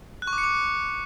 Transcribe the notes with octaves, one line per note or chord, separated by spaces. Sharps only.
F#6
C#6
D6
C#7
D6